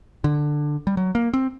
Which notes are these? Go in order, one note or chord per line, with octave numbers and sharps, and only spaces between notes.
D3
G3
F#3
A#3
C4